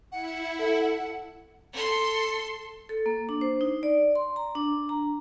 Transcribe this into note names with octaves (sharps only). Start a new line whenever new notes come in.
E4 F#5
A4
A4 C6
A4
A#3
D4
C5
D#4
D5
C6
A#5
D4
A#5